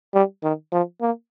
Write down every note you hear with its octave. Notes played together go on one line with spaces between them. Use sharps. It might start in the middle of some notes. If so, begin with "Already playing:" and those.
G3
D#3
F3
A#3